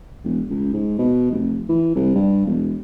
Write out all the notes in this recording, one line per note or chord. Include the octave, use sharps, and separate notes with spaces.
E1
C#2
G#2
B2
F1
E3
C2
G2
E1